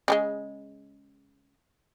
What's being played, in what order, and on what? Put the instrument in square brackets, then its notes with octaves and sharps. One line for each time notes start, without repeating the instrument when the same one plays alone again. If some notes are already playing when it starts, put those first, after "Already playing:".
[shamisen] C#3 G3 G#3